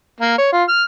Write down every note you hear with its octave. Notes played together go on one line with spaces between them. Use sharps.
A#3
C#5
F4
F6